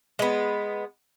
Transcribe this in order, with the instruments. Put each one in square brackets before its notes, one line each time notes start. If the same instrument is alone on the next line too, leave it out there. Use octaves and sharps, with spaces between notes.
[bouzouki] G#3 B3